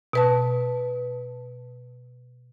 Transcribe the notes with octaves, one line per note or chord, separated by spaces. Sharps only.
B2 B4 A5